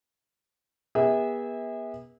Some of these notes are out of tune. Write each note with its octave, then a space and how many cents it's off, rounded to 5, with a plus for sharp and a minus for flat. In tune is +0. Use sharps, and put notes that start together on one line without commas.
B3 -35 G#4 -35 E5 -30